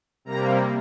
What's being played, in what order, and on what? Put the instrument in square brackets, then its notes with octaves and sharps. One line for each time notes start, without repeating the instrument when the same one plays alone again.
[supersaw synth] C3 G3 A#3 A#5